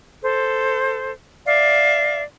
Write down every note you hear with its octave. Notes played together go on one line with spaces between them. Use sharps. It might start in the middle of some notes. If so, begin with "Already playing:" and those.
A4 C5
D5 E5 F5